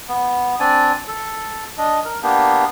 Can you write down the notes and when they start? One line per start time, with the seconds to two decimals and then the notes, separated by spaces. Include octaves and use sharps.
0.09 B3
0.60 C4 D4 D5 G#5
1.08 A4
1.78 D4 D#5
2.05 A#4
2.23 A#3 B3 D4 G4